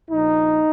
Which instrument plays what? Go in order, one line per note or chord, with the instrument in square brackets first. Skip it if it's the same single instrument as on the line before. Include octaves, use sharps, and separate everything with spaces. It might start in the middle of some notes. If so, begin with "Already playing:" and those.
[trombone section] A#1 A#2 F3 D#4